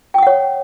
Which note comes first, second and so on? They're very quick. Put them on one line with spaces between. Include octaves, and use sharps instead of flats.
G5 D#6 F#5 C#5